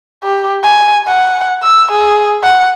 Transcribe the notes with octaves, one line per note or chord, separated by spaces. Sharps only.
G4
G#5
F#5
E6
G#4
F#5